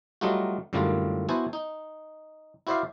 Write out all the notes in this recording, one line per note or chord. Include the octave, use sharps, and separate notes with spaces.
F#3 G3 A3 D#4 F4 F#4
F#2 A2 D3 G3 A#3 F4
B3 E4 F#4 C5 G#5 A5
D#4
E4 F#4 C5 D5 E5 F5